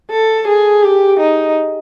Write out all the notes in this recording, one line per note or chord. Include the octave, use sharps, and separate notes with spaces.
A4
G#4
G4
D#4